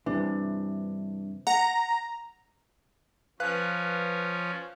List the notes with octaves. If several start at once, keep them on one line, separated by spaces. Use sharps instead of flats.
G2 C3 E3 D4
F#5 A#5
F3 C#4 B4 F5 F#6